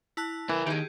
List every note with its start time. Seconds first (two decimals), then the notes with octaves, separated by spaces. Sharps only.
0.17 E4 A5 F#6
0.50 E3 E4 A#4
0.67 D#2 D#3 G4 G#4